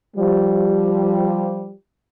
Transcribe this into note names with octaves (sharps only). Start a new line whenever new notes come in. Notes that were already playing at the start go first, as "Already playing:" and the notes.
F3 G3